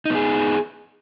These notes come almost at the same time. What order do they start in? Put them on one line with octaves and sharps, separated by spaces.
D#4 B3 G#4